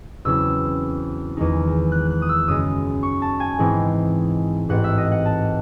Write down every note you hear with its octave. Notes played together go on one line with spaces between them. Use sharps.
E2 C#3 F#3 C4 E4 E6
E2 D#3 G#3 D#4
F#6
F#6
D#6
E6
F#2 C#3 G#3 D#6
C#6
A5
G#5
G#2 E3 G#3 C4 E4
A1 G#2 E3 C4 F#5
E5
D#5
F#5
A5